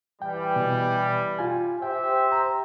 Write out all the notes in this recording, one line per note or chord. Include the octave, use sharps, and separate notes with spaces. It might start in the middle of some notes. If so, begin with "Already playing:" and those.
E3 G3 G5
B2
F4 G#5
G4 C5 E5 G5
A#5